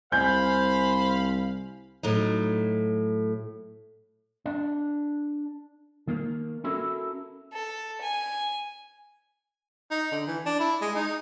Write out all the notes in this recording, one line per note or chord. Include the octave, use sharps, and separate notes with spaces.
C2 C5 F5 G#5 B5 G6
A2 F#3 D#4
D4
D#3 A#3 A#4
C#4 E4 F#4 A4 A#4
A4
G#5
D#4
D3
E3
D4
E4
G#3
D#4